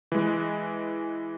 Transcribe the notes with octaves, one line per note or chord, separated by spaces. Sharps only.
E3 G#3